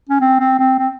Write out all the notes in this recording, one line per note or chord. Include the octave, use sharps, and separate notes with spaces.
C#4
C4
C4
C4
C4